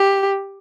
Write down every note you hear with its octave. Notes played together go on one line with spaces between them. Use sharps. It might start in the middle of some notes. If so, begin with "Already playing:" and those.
Already playing: G4